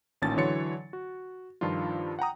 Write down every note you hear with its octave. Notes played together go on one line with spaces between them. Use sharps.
A1 A#2 D#3 C#4 A5 A6
D3 E3 F#3 C#5 C6 C#7
F#4
G2 D#3 F3 D4 F4
F#5 G5 A#5 D#6